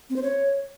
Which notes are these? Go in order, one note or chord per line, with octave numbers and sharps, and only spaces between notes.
C4
C5
C#5